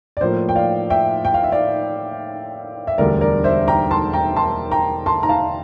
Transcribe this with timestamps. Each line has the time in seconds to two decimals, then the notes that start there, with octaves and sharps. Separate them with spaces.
0.17 D5
0.21 A2 F3 A#3 C5
0.49 G5
0.56 D5 F5
0.90 E5 G5
1.25 G5
1.34 F5
1.43 E5
1.52 D5 F5
2.87 E5
2.98 E1 D2 D3 G3 A#4 D5
3.21 A#4 D5
3.44 C5 E5
3.68 G5 A#5
3.91 A5 C6
4.13 G5 A#5
4.36 A5 C6
4.71 G5 A#5
5.06 A5 C6
5.23 A#5
5.29 F5 A5